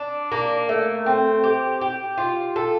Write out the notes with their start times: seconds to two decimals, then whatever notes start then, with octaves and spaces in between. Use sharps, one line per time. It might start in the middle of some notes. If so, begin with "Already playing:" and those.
Already playing: D4
0.32 A#3
0.69 A3
1.06 C4
1.43 G4
1.81 G4
2.18 F4
2.56 A4